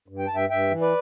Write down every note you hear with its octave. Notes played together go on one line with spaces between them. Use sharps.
G2
G5
G2 A5
E5 G5
G2 E5 G5
E3
B4 D5